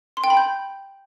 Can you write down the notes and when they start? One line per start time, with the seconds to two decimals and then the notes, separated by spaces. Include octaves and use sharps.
0.17 C6
0.24 G5
0.30 B5
0.37 G6